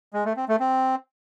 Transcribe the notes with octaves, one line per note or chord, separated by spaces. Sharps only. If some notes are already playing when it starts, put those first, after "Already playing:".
G#3
A3
C4
A3
C4